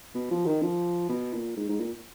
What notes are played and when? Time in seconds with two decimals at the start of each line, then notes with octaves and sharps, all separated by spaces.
0.15 B2
0.31 F3
0.46 D#3
0.63 F3
1.09 B2
1.34 A#2
1.57 G#2
1.69 G#2
1.80 A#2